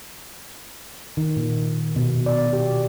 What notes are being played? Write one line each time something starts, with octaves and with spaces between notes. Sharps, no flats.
D#3
A#2
B2
D5
G4